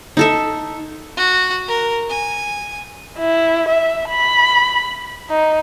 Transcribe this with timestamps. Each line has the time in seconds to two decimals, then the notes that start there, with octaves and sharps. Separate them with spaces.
0.17 D#4 A4 E5
1.17 F#4
1.68 A#4
2.09 G#5
3.19 E4
3.69 E5
4.09 B5
5.30 D#4